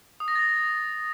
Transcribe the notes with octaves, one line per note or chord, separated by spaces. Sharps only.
D#6
A#6
A6